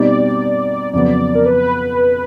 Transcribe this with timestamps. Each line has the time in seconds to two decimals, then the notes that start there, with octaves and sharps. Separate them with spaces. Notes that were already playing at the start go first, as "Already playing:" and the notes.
Already playing: B2 G3 C4 D#4 D5
0.93 F2 C#3 F#3 B3 D5
1.35 A#4
1.45 B4